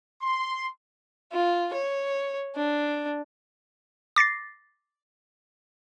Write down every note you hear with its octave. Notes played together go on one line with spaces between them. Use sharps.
C6
F4
C#5
D4
D6 A6 A#6 C7